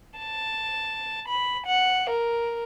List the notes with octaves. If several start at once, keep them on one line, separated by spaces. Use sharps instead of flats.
A5
B5
F#5
A#4